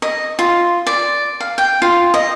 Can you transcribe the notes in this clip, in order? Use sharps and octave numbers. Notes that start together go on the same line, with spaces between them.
D#5
F4
D5
F5
G5
F4
D#5